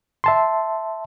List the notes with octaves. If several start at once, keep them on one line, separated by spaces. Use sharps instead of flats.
E5 A5 C6